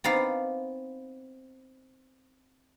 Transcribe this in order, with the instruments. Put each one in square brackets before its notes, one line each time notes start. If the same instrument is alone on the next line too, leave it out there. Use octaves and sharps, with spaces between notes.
[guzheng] B3 C4 D#4 D5 F5